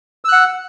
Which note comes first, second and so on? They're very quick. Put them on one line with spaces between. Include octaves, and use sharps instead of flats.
E6 F#6 F#5